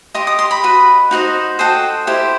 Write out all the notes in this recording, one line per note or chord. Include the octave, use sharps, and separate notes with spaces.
G4 D#5 C6
D#6
C6
B5
F#4 B4 D#5
D#4 F#4 C5 D#5
F#4 A4 C5 D#5 G5
E4 G4 C5